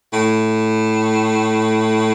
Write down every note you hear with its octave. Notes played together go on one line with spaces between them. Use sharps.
A2